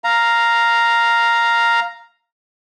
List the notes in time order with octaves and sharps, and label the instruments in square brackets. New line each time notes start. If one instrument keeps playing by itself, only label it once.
[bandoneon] F5 A#5